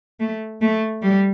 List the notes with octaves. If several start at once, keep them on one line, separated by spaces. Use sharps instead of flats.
A3
A3
G3